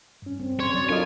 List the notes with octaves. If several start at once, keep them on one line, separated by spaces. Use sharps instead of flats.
G2 C#4
C4
C#5 C6
F#3 D5
D4 F4 A4 A#4 D#5 G#5